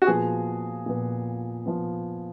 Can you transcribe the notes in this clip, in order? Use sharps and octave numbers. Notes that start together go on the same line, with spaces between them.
F#4
A#2 F3 B3 G#4
A#2 F3 B3
A#2 F3 B3